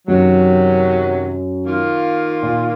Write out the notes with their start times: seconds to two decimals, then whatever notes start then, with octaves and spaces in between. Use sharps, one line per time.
0.07 F#2 C3 D#3 F#3
1.64 D#3 A#3 F4
2.43 A#2